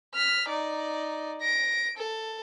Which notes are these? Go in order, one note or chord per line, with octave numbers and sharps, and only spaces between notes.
F6 B6
D#4 D5
A#6 D7
A4